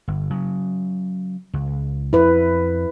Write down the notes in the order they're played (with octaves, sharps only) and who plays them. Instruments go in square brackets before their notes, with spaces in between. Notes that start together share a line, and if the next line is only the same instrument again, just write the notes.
[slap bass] G1
C#3 F#3
C#2
[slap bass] F2 [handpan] E4 B4